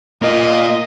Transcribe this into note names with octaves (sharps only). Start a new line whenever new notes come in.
A#3 F4 D#5